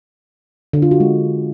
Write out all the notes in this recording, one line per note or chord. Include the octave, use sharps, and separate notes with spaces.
D3
F4
F#4
G#3